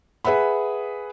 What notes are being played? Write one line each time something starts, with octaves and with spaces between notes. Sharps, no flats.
G#4 B4 E5 F#5 B5